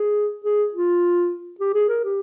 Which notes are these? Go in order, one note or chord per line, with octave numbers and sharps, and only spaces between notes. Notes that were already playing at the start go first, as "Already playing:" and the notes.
Already playing: G#4
G#4
F4
G4
G#4
A#4
G4